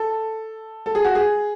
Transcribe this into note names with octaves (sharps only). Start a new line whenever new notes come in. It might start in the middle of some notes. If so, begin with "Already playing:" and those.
Already playing: A4
A4
G#4
F#4
G#4